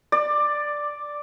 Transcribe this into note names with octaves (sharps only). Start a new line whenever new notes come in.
D5